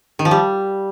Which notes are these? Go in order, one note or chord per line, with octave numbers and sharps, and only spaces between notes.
D#3
F3
G3